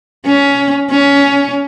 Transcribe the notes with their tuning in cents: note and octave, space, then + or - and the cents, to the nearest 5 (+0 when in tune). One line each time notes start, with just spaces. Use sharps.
C#4 +20
C#4 +20